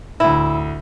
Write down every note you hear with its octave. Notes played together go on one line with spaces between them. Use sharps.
D2 A2 E4